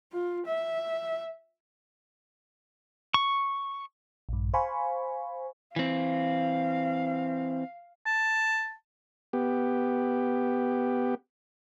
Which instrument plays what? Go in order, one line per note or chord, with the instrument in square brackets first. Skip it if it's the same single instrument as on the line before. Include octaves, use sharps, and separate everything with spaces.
[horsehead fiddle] F4
E5
[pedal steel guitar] C#6
[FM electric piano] A#1 G2
C5 F5 G#5 B5 C#6
[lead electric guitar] E3 C4 [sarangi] F5
[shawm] A5
[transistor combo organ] B3 G4